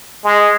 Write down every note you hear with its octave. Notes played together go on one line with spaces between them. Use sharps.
G#3